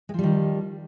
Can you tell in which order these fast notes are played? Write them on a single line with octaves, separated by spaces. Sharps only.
G#3 F3 G3 D#3